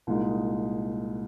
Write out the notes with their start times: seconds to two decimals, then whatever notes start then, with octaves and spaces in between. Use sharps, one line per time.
0.07 C2 A#2 G#3 D#4